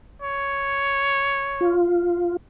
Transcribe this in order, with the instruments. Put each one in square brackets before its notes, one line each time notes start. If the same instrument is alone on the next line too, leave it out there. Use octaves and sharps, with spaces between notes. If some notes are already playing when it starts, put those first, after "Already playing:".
[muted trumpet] C#5
[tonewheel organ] F4